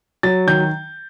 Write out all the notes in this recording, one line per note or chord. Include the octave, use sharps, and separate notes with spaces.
F#3 A6
D#3 G6